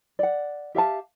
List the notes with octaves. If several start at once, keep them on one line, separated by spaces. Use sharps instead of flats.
D5 F#5
G4 E5 F5 A5